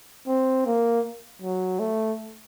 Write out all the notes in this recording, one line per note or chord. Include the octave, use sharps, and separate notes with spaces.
C4
A#3
F#3
A3